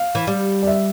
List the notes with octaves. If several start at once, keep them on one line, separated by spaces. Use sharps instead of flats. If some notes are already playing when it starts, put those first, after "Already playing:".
Already playing: F5
E3
G3
D5
E5